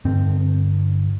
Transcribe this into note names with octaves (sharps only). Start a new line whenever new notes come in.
G2 D3 C4